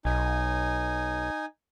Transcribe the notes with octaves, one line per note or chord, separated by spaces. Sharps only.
B1 D#4 G#5